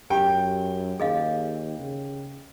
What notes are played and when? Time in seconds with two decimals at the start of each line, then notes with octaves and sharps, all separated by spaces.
0.10 F#2 G4 G5
1.00 D#2 G#4 D#5 F5
1.80 C#3